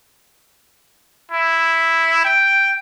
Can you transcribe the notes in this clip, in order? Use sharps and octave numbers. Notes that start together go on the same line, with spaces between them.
E4
G5